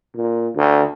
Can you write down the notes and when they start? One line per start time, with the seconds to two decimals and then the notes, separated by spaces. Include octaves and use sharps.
0.15 A#2
0.56 D2